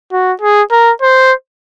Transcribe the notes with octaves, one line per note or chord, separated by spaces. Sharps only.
F#4
G#4
A#4
C5